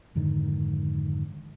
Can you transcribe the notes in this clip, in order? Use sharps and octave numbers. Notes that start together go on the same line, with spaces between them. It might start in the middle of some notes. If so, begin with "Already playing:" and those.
F2 G#2 D3 D#3